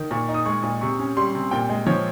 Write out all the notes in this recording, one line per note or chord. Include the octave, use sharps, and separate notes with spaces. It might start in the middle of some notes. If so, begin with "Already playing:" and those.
Already playing: D#3
A#2 C#6
D#4
D#6
G#3 C#6
A#2
C3 C#6
C#4
G3 C6
C3
A#2 G5
G#3
F3 C#5